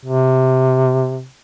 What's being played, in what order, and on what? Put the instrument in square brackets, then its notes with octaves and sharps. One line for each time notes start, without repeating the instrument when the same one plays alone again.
[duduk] C3